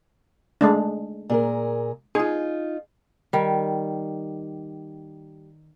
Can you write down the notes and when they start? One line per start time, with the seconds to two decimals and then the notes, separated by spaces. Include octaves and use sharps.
0.61 G#3 A3 D4
1.30 A#2 G#4 A#4
2.15 D#4 F4 G#4
3.33 D#3 G3